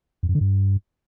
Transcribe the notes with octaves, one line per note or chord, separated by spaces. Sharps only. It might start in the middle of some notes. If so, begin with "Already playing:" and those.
F2
F#2
D3
G2